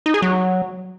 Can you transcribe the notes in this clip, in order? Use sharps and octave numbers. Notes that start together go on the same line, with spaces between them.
D#4
G#4
F#3